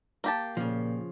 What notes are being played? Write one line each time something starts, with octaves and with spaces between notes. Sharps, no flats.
A#3 G4 A5
A#2 C#3 F3